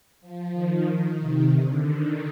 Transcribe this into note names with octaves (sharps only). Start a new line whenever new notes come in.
F3
D#3
C3
D3
D#3